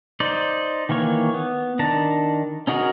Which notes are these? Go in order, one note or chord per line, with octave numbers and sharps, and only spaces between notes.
D#4 C5 D5
D#3 E3 A#3 C#5
B3
D#3 D4 A5 A#5
C#4 D#4 F#4 G#4 A#4